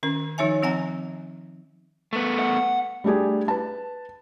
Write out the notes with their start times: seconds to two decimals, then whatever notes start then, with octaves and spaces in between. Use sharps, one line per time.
0.03 D#3 C#4 A#4
0.38 D#3 F3 D#4 C#5 E5 G#5
0.63 F3 C4 F#5 G#5 A#5
2.13 A3 B3
2.39 F#5
3.04 G3 A3 D4 G4 G#4
3.48 B4 A5